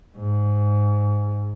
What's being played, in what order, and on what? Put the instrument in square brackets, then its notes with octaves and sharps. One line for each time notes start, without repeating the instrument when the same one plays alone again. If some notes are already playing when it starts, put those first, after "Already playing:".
[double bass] G#2